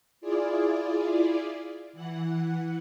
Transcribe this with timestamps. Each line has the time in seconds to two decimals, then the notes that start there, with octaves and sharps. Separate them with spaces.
0.21 E4 F4 G#4 D5
1.93 E3 F#5